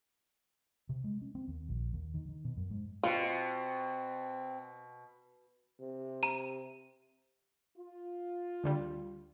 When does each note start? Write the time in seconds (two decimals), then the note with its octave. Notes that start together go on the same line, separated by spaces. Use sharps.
0.89 C3
1.04 G#3
1.22 C#4
1.35 C4
1.48 D#2
1.69 A#1
1.93 D#2
2.14 D#3
2.29 D#3
2.45 B2
2.57 F#2
2.70 G#2
3.03 B2 C4 F4
5.80 C3
6.23 A#5 D#7
7.76 F4
8.64 D2 D3 G3